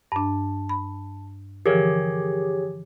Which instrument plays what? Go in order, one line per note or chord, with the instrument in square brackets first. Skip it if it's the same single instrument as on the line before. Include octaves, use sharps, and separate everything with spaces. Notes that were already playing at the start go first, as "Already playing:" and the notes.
[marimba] G2 D4 [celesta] A5
[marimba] B5
[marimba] D3 E3 F3 [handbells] G4 G#4 C#5 [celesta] A#4